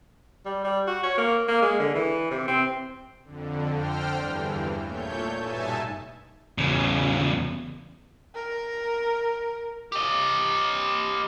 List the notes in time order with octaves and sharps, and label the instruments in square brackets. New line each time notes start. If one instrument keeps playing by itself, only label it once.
[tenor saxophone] G3
G3
F#4
C#5
A#3
A#3
G#3
D3
E3
C3
C4
[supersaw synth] F2 D3
D3 C5 G5 F6
E2 G2 E3
A#2 A3 C#5 G6
G2 B2 D#4 E5 G#5 A5
[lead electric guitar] E2 C#3
[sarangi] A#4
[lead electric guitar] G4 D#5